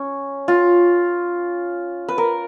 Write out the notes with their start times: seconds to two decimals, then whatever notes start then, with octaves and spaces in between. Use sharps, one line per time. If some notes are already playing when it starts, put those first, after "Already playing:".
Already playing: C#4
0.48 F4
2.08 B4
2.18 A#4